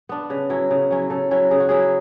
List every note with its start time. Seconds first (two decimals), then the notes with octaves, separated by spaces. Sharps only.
0.09 B3 D4
0.30 C#3 B4
0.50 F#3 C#4 E4
0.71 C#3
0.91 F#3 C#4 E4
1.10 C#3 A4
1.31 F#3 C#4 E4
1.51 C#3 G#4
1.60 F#4
1.69 F#3 C#4 E4 G#4